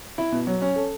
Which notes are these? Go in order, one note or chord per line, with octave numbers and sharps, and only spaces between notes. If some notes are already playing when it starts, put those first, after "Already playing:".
E4
B2
F#3
C#4
A4